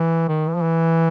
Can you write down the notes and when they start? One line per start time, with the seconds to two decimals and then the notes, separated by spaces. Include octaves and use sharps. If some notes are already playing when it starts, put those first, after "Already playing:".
Already playing: E3
0.28 D#3
0.47 E3
0.54 F3
0.62 E3